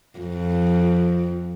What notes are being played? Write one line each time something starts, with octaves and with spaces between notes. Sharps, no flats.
F2